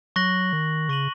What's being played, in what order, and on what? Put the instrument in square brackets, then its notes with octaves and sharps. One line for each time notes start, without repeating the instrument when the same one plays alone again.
[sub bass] F#3 [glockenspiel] C#6 F#6 A#6 F#7
[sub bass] D#3
[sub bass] C#3 [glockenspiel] C#6 A#6 D#7 F#7